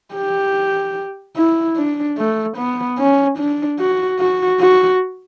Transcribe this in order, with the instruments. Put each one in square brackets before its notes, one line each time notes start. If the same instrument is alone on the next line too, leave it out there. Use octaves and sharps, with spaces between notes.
[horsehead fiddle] G4
E4
D4
A3
B3
C#4
D4
F#4
F#4
F#4